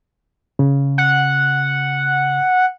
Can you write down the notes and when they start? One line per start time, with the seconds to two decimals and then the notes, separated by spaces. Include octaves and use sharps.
0.59 C#3
0.98 F#5